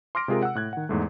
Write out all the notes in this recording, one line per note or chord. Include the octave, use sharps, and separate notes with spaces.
C6 D6 F6 A#6 D7
C3 G#3 F4 G#4 A#4
F#5 E6
A2 F#6 G#6
D#3 F#5
E2 G#2 A3